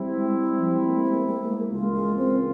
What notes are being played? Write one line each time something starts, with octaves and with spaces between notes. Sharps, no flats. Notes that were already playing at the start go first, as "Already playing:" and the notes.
Already playing: G3 C4 E4
G#3
F3
G#3
A#3
G#3
A#3
G#3
A#3
G#3
A#3
G#3
A#3
G#3
C#2 C#3 E3 G#3 A#3 F4
G#3
C4